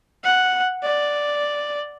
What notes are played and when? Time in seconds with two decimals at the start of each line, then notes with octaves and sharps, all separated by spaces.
0.24 F#5
0.83 D5